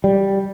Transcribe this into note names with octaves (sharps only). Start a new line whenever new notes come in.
G3